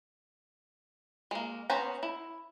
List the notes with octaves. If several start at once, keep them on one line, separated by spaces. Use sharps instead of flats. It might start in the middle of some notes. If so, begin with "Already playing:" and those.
G#3 A#3
B3 C#4 B4 C5 A#5
E4